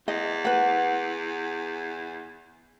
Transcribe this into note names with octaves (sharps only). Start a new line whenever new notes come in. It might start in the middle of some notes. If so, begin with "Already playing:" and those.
E2 D#5
B4 F#5